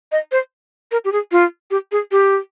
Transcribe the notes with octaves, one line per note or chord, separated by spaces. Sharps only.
D#5
C5
A#4
G4
G#4
F4
G4
G#4
G4